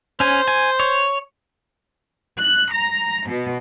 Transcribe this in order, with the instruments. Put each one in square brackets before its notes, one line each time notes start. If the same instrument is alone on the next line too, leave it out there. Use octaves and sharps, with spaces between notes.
[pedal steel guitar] C#4 G#5 [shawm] C5
[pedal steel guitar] G#5
C#5
[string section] F#6
A#5
B2